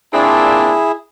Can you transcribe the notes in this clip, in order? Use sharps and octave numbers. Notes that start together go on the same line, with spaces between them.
A#2 C4 D4 E4 G#4